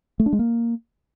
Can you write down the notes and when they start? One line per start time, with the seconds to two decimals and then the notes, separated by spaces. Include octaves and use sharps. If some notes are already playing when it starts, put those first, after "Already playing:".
0.20 A3
0.26 D4
0.33 G#3
0.39 A#3